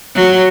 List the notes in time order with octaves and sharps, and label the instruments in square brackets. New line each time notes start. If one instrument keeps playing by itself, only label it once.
[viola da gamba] F#3